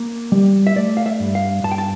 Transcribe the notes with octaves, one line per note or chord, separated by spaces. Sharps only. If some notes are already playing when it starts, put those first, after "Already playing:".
Already playing: A#3
G3
E5
A3 D5
F5
E5
G2
F5
G2 A5
G5
A5